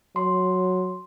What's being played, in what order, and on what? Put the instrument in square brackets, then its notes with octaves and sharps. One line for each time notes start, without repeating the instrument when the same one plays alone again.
[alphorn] F#3 [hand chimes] C6